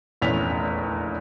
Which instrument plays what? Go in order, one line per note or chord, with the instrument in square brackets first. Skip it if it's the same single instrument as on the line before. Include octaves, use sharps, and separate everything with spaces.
[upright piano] F1 A#1 E2 C#4 B6 F7